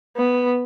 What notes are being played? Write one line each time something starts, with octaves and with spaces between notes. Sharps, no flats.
B3